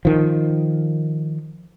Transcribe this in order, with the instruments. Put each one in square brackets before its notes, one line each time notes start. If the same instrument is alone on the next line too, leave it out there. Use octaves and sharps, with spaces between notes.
[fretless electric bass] D#3 F3